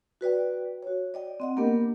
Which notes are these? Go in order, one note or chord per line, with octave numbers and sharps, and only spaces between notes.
F#4 B4 D5 G5
F#4 C#5
D5 D#5 G5
C4 D#5 F#5
A#3 B3 D4 G4 A#4